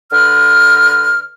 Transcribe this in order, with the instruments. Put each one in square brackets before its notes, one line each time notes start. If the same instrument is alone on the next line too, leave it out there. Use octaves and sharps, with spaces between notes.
[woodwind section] D3 B4 F6